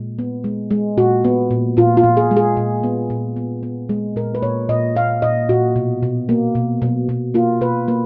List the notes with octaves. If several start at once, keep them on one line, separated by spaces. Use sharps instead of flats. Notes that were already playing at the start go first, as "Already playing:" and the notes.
Already playing: A#2 G#3
B3
G#3
G#3
A#2 F#4
B3
A#2
A#2 F4
F4
A#2
G#4
G#3
G#4
A#2
B3
A#2
B3
B3
G#3
A#2 A#4
B4
A#2 C#5
A#2 D#5
A#2 F5
A#2 D#5
A#2 F#4
B2
B2
A#3
B2
B2
B2
A#3 F4
B2 B4
A#3 B4